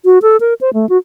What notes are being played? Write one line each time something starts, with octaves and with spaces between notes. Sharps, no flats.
F#4
A4
A#4
C5
A3
F#4